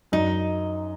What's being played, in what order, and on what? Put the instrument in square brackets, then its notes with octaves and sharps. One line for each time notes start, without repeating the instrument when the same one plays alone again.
[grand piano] F#2 [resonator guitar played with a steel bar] D#4